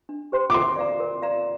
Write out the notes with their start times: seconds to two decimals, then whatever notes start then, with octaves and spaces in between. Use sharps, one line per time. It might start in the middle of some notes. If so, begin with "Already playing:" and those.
0.09 D4
0.32 G4 C5 G5 C6
0.50 D6
0.54 A#4 C6
0.76 D5 F5 A#5
1.00 A#4
1.22 D5 F5 A#5